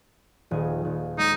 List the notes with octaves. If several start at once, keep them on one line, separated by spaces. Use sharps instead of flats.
D#1 G#4
D#1
G#3 D#4